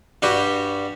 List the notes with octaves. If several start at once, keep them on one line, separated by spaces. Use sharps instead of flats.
G2 G3 F#4 G4